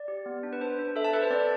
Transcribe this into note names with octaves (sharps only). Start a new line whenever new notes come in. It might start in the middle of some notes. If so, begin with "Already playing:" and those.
Already playing: D5
G4
B3
D4
B4
D4 C5
D4
A4 E5
A5
A4 B4
C5
C4 D5